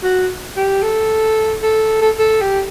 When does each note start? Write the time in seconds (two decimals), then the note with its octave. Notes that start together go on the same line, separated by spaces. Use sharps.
0.03 F#4
0.56 G4
0.83 A4
1.62 A4
2.01 A4
2.19 A4
2.41 G4